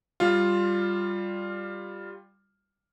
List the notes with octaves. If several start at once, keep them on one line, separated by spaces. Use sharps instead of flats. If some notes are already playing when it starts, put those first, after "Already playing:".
G3 F4